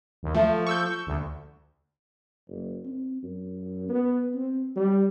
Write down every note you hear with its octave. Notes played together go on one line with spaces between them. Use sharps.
D#2
F3 A3
C#6 E6 G6
D2
F#1
C4
F#2
B3
C4
G3